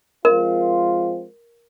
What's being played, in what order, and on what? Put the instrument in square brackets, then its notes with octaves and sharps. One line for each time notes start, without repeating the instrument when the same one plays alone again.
[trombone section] F3 G#3 C4 F4 [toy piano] A#4